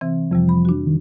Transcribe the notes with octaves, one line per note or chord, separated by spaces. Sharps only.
C3 E3 C4
F2 C3 F3 G3
B5
D4 F#4
D#3